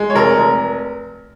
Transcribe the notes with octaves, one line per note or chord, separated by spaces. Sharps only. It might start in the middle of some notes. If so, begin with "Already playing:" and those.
Already playing: G#3
C#5
F1 A#4
F1